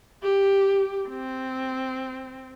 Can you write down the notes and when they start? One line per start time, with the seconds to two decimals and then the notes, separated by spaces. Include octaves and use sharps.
0.23 G4
1.09 C4